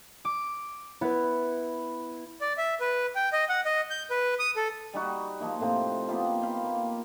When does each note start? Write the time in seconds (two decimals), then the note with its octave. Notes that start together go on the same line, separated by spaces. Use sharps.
0.25 D6
1.01 B3 E4 B4
2.41 D5
2.58 E5
2.80 B4
3.16 G5
3.33 D#5
3.49 F#5
3.65 D#5
3.90 G6
4.10 B4
4.39 D#6
4.56 A4
4.94 G3 D#4 F#4
5.40 F3 A#3 D#4
5.60 A2 C3 C5
6.08 A#3 B3 F4 G4
6.42 B4 F5 G5
6.63 A#3